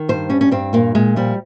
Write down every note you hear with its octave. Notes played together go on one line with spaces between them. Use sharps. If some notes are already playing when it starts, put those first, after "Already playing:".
Already playing: D#3
G2 C5
G3 C#4
C#4
G2 C4
A#2 A#3
A#2 G#3
F3 G3